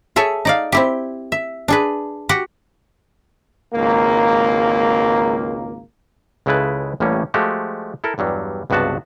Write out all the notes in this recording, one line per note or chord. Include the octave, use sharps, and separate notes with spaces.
G#4 A4 C#5 E5 G#5
D#4 D5 F5
C4 E4 G4
E5
D4 G#4 B4
F#4 G4 F#5
G#1 C#2 A#3
C#2 C#3 G#3 E4 A4 B4
A1 A2 G3 A#3 C#4
F3 G#3 A3 F#4 G4
E4 A4 A#4
E2 G2 F#3 G3
C#2 G2 C3 B3 F#4 A5